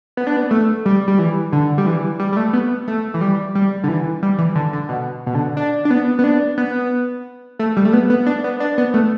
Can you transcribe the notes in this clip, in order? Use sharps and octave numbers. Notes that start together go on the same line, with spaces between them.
B3
D4
B3
A3
G3
G3
E3
D3
G3
E3
G3
G3
A3
B3
A3
E3
G3
G3
D3
E3
G3
E3
D3
D3
B2
B2
D3
D4
D4
B3
B3
D4
B3
A3
G3
A3
B3
B3
D4
B3
D4
B3
A3